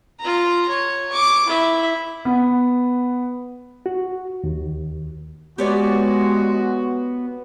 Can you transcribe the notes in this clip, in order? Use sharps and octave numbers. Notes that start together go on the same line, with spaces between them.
F4 A#5
C#5
C#6 D6
E4 E5
B3
F#4
D#2
G#3 B3 F#4 G4 C#5 D5